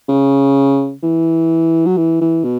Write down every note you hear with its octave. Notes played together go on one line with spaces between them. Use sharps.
C#3
E3
F#3
E3
E3
B2